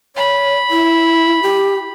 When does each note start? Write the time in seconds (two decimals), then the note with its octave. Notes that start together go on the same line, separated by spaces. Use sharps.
0.16 C#5 B5
0.71 E4
1.42 G4